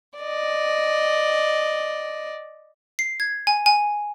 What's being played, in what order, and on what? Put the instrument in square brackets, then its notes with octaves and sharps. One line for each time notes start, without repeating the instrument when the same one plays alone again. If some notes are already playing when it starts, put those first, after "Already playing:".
[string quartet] D5 D#5
[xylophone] C7
G#6
G#5
G#5